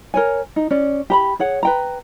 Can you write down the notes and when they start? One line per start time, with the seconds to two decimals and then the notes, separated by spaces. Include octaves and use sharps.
0.14 A#4 C#5 G#5
0.56 D#4
0.71 C#4 D5
1.10 G4 A#5 B5
1.39 G#4 C#5 F#5
1.63 B4 G5 A#5